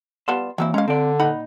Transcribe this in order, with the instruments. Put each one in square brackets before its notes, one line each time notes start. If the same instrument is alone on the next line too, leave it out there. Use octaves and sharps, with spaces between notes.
[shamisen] G3 B3 F4 [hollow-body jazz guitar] A5 C6
[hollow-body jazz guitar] E3 A#3 [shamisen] F#3 C4 E4
[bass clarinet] G#3 [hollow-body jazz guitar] C#4 [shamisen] F5 A#5
[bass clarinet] D3 [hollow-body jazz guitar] C4 D5
[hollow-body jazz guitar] A#2 D#4 [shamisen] B4 F#5 B5